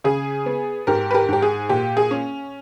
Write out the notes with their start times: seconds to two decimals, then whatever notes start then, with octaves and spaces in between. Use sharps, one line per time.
0.04 C#3 G#4
0.46 B3
0.87 G#2 G4 A#4
1.11 B4
1.14 G4 A#4
1.29 G#2 G4
1.42 G#4
1.69 A#2 G4
1.97 G#4
2.11 C#4